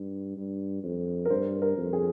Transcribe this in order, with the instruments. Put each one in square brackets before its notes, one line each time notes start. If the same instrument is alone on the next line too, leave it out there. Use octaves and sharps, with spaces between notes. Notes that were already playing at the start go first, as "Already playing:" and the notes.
Already playing: [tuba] G2
G2
F2
[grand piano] A#4
[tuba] G2 [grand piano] C5
[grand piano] A#4
[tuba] F2
[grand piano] G#4